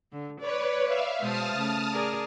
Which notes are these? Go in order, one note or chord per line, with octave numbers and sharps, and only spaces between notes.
D3
B4 C#5 D5
E5 F5
B2 G#3 C5 A5 D#6 F6
C#3 A3
G#4 A#4 D5